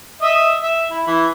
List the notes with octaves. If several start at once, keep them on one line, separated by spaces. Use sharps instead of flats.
D#5 E5
E5
E4
E3 E4